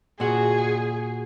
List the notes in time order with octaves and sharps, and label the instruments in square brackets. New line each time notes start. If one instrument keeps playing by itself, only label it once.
[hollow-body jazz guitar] A#2 F#4 [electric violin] G#4